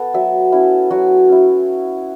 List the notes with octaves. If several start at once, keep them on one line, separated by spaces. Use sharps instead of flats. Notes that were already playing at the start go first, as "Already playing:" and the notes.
Already playing: B3 A4
F#3 E5
C#4 E4
F#3 F#4
C#4 E4